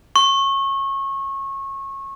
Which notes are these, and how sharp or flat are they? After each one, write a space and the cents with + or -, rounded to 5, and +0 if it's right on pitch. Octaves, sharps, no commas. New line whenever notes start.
C#6 -25